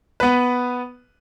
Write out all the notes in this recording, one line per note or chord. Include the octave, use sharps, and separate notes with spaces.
B3 B4